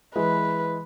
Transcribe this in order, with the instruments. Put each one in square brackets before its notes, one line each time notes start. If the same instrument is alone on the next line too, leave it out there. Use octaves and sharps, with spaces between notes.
[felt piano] E3 G#3 [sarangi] B4